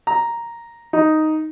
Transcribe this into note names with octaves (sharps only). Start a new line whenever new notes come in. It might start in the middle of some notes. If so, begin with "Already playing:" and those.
A#5
D#4